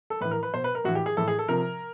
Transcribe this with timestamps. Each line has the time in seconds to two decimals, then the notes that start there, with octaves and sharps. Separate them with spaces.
0.10 A4
0.21 A2 B4
0.25 E3
0.31 A#4
0.43 B4
0.54 B2 C5
0.64 B4
0.75 A#4
0.84 A2 F#4
0.88 E3
0.95 G4
1.06 G#4
1.17 A2 E3 A4
1.28 G#4
1.39 A4
1.48 C3 F3 A#4